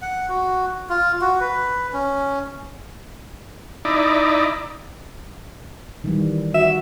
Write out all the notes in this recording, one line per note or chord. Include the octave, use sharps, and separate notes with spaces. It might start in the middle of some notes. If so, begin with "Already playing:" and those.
F#5
F#4
F4
F#4
B4
C#4
D#4 E4 D5
D#3 E3 G3
F#4 E5